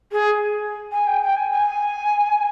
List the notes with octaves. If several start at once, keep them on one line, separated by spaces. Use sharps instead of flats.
G#4
G#5
G5
G5
G#5
G#5